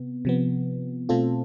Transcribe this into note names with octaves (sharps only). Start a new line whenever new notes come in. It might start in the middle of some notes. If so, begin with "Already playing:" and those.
Already playing: C3 B3
C3 F3 B3
B2 A3 C4 F4 A4